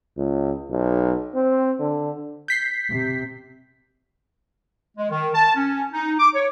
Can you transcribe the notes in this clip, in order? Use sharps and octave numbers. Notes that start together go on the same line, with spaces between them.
C#2
B1
C4
D3
G6 B6 C7
C3
G#3
D#3
A5
C#4
D#4
D6
C#5